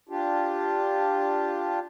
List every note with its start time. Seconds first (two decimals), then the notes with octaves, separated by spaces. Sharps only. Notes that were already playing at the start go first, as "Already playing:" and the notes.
0.09 D4 F4 G4